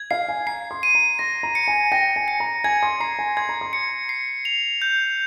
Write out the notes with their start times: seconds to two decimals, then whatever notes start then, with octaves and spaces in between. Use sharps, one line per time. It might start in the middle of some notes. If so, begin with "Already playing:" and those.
Already playing: G#6
0.11 F5 C7
0.29 G#5
0.47 A#5 C7
0.71 C6
0.83 D#7
0.95 A#5
1.19 C6 A#6
1.43 A#5
1.55 C#7
1.68 G#5
1.92 G5 A#6
2.16 G#5
2.28 C#7
2.40 A#5
2.64 G#5 G#6
2.83 C6
3.00 A#5 C7
3.19 G#5
3.37 C6 G#6
3.49 A#5
3.61 C6
3.73 C#7
4.09 C7
4.45 F7
4.82 G6